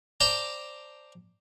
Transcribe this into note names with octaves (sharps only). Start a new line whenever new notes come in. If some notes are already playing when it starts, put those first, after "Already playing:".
C5 D5 G5 A5 A#5